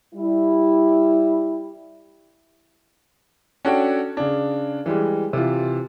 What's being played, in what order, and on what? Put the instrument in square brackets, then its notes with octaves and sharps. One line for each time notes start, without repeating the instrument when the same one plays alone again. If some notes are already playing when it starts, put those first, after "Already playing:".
[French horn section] G3 E4
[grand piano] C#4 D4 F#4 A4 G5
C#3 D4
E3 G3 G#3
C3 E3 F4